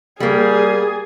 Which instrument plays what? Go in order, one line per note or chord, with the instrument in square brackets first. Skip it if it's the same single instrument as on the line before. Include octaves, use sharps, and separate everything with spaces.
[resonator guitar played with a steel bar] G3 A#3 [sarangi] G#4